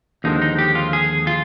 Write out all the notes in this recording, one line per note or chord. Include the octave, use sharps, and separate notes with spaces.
D#2 D3 F3 G#3 D#4
D#4
G4
F4
G#4
F4